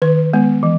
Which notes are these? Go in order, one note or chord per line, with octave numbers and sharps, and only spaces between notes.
D#3 B4
G#3 B3
E3